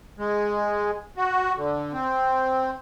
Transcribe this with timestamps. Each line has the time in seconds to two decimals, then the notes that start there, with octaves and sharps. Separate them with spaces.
0.18 G#3
1.17 F#4
1.57 D3
1.93 C4